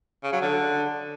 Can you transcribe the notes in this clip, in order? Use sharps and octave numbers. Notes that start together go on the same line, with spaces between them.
C#3
F#3
D3